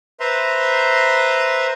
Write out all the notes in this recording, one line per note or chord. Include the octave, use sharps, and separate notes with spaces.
B4 C5 E5 A#5 C6